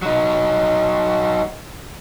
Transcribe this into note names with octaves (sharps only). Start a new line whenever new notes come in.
F#3 D#4